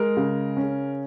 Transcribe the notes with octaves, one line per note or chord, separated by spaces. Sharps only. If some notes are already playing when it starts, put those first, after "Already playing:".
Already playing: G#3 A#4
C#3
C#4